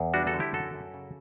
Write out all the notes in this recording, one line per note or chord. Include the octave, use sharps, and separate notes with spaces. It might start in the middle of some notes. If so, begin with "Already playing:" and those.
Already playing: E2
G3 D4 F#4
F#4 A4
D3
E4 G4
F#2 F#4 A4
F#2
C#3